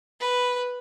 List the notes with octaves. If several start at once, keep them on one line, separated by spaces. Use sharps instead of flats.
B4